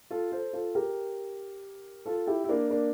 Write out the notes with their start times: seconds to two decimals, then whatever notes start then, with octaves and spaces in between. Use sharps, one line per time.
0.10 F4 A4
0.32 A4 C5
0.53 F4 A4
0.75 G4 A#4
2.06 F4 A4
2.27 E4 G4
2.44 E4
2.49 A#3 D4
2.70 A#3 D4